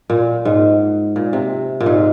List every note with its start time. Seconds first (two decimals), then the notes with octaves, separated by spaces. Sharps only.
0.10 A#2
0.45 G#2
1.16 A#2
1.33 C3
1.80 A#2
1.86 G#2